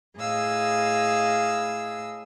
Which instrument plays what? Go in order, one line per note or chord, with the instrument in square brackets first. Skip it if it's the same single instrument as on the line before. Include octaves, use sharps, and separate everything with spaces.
[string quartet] A2 G#4 D#5 F5 E6